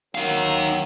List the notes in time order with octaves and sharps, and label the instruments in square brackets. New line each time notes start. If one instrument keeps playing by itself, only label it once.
[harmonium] D#3 F#3 [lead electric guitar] D#4 F5